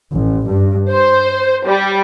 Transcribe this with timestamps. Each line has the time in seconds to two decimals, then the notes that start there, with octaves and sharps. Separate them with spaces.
0.13 A1
0.45 G2
0.90 C5
1.66 G3